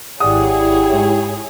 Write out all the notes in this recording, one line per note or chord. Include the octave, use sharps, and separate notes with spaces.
G#1 E4 G4 G#4 C#5 D5 F#5 D#6
G#2